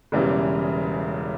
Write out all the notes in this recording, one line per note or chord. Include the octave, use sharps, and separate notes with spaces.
E1 E2 C#3 E3 G3